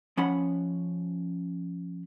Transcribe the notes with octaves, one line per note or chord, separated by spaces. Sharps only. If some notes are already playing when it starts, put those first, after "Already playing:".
F3 C#4 F#5 B5